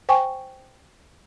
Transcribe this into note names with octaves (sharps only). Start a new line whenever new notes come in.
C5 G5 G#5 C#6